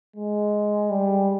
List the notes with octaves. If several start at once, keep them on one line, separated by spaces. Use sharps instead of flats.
G#3
G3